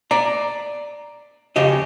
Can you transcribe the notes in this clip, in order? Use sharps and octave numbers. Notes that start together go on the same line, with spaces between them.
D5 A#5
F2 C#3 G4 D#5